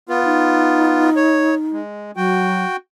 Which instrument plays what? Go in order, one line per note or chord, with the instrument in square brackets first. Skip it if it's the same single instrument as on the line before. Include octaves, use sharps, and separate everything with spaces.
[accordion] B3 F4 [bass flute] B4
[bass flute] D#4
[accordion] C#5
G#3
[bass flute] F#3 [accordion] F#4 G5